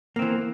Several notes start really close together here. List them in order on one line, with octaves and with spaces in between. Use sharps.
A#3 C4 E3